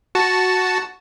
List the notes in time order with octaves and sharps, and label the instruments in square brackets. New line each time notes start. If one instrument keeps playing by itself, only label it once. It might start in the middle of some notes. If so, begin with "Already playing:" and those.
[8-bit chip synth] F#4 A5